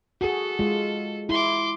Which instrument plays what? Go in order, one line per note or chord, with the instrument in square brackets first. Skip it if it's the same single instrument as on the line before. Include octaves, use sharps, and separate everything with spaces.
[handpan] F#4 G#4 [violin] A4
[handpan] G#3 F4
[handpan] E4 [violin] C6 D6